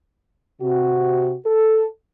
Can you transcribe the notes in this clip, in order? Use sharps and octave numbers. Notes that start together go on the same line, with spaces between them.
C3 F#4
A4